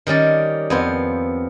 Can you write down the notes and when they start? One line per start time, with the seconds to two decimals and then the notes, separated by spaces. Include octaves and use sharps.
0.07 D#3 G3 C#4 D5
0.70 F2 B3 C5